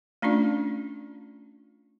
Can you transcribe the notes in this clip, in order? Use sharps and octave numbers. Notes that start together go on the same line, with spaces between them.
A3 C#4 D4 F4 D5